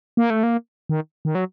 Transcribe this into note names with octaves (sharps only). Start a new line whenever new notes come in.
A#3
A3
A#3
D#3
D#3
F#3